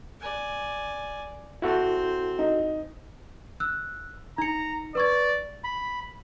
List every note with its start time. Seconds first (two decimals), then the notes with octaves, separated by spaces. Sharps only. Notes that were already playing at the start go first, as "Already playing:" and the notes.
0.20 D5 G#5
1.62 C4 E4 F#4 A4 C5
2.39 D#4
3.60 E6 F#6
4.38 D#4 A#5 C#7
4.95 B4 D5 C#6 G#6
5.64 B5